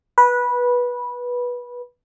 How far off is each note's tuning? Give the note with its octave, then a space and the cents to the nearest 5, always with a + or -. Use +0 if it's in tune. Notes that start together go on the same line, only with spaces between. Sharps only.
B4 -15